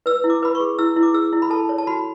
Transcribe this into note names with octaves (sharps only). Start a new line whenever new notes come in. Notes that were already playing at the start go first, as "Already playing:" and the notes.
B4 E6
E4
D6
B4 B5
C#6
G#4
E4 E6
E4
D6
G#4 E6
E4
B5
A4 A5
C#5
A5
F#4 B5